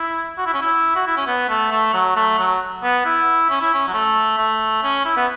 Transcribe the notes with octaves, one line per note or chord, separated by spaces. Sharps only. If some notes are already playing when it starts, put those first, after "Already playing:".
Already playing: E4
F#4
E4
C#4
E4
F#4
E4
C#4
B3
A3
A3
F#3
A3
F#3
B3
E4
C#4
E4
C#4
F#3
A3
A3
C#4
E4
B3